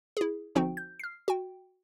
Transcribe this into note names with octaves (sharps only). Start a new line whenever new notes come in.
E4 G#4
G1 F3 C4 D#4 F#4 G5
G6
F6 C7
F#4 G5